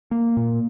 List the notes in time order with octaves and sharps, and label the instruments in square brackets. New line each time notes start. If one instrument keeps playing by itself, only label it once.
[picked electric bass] A#3
A#2